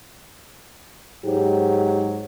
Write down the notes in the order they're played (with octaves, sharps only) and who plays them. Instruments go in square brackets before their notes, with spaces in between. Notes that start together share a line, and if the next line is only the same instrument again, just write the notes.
[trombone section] G#2 F#3 [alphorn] G4